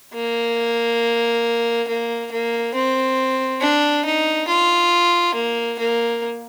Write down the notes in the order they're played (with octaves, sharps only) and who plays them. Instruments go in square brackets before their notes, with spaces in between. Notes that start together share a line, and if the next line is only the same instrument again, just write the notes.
[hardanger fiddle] A#3
A#3
A#3
C4
D4
D#4
F4
A#3
A#3